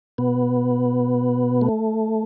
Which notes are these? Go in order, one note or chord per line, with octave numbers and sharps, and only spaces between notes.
B2 B3
A3